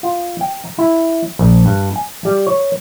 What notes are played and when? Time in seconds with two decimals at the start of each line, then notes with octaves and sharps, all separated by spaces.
0.03 F4
0.41 G5
0.65 A#5
0.78 E4
1.39 A#1
1.65 G2
1.96 G#5
2.25 G3
2.47 C#5